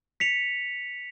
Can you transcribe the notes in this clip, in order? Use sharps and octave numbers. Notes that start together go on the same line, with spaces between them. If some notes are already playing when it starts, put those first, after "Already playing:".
B6 C#7 F7